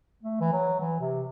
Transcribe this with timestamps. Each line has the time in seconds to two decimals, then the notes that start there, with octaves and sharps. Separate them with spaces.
0.23 A3
0.41 E3
0.53 F#3
0.81 E3
1.00 C3